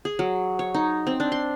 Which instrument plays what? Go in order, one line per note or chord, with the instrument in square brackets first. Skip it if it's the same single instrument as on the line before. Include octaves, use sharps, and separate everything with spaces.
[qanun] G#4
F#3
C#5
D#4
C4
D4
C6